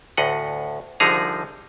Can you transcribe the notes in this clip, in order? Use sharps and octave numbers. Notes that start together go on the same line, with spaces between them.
D2 A2 D#5 F#5
C2 D3 F3 D#4 G#4 A#5